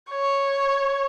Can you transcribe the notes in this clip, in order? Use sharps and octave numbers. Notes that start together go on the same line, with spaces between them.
C#5